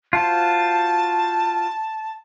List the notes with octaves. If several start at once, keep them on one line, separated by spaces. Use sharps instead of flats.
F4 F#4 C5 A5